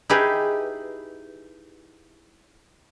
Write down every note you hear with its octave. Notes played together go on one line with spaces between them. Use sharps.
D#4 E4 G4 G#4 B4